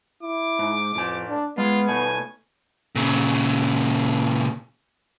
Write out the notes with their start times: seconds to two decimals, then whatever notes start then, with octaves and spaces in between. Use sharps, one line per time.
0.23 E4 D6
0.59 G#2
0.95 F2 A2 G#5
1.28 D4
1.58 G#3 B3 F4
1.88 B2 A3 G#5
2.96 A#2 C#3